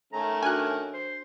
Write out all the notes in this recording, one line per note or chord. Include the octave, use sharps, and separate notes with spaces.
D#3 A3 C#4 A#5
D4 F#4 A#4 G#5 F#6
C5